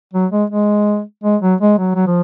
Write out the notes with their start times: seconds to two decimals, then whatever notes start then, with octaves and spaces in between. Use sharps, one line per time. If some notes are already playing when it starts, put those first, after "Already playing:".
0.13 F#3
0.31 G#3
0.50 G#3
1.24 G#3
1.42 F#3
1.61 G#3
1.78 F#3
1.95 F#3
2.06 F3